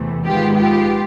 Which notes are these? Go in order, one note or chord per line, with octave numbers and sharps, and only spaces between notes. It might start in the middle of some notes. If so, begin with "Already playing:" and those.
Already playing: E2 C3 E3 A3
A#1 G#2 D#3 G#3 B3 F4 G4
F4 G4